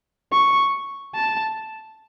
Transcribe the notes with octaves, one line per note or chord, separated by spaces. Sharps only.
C#6
A5